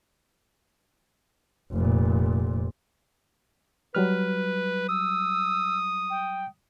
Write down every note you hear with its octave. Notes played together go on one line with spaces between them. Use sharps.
F1 A#2
F#3 G3 B4 F6
D#6 E6
G5